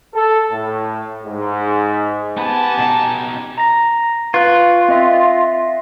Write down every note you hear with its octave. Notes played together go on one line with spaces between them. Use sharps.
A4
A2
G#2
B3 G4 B4 G#5 A5
B2 D#4
A#5 A#6
F4 B4 C#6 F#6
C4 D#5 E5